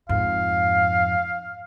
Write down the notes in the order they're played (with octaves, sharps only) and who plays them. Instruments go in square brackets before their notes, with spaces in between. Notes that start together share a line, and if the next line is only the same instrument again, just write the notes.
[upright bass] F2 G#2 [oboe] F5